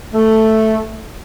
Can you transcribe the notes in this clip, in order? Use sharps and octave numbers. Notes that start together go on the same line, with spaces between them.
A3